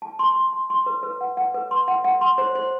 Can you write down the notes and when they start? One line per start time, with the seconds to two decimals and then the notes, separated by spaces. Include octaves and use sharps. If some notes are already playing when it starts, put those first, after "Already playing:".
0.02 A5
0.19 C6
0.36 C6
0.53 C6
0.70 C6
0.86 B4
1.03 B4
1.21 F#5
1.37 F#5
1.54 B4
1.71 C6
1.88 F#5
2.04 F#5
2.21 C6
2.38 C5
2.55 C5